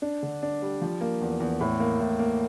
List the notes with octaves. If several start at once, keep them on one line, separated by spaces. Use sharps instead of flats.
D4
D3
D4
G3
F3
A#3
E2
E2
A2
A#3
A2
A#3